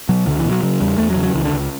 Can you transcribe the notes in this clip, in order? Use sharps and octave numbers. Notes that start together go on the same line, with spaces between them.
B2 F#3
C#2 D3
E3
B2
F#3
C#3 F#3
E2 G3
E2 A3
F#3
C#3
F#3
C#2 E3
D3
C#2